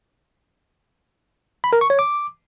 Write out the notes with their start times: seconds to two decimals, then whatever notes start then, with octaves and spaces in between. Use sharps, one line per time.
1.64 B5
1.73 A#4
1.81 C#6
1.90 C#5
1.99 D6